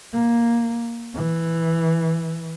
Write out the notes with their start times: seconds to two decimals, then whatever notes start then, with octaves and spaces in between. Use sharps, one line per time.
0.14 A#3
1.15 E3